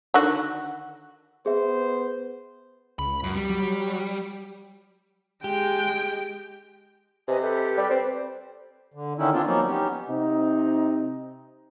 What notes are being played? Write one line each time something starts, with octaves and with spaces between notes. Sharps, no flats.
D3 D#3 F#4
B3 G#4 C5 E5
C#2 B5
F#2
G3
F#3
G#3 G4 G5
C3 B4 D#5 G#5
G4 A4 B4
G3
C4
D3
D3 D#3 C#4 D#4 E4
B3 C4 D4 F4
F3 F#3 A#3 B3 C#4 D#4
B3 C#4 D#4 G4
C3 C4 D#4